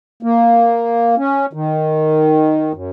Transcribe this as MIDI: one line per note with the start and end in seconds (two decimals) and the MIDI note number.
0.23 1.15 58
1.18 1.46 61
1.53 2.72 51
2.74 2.90 42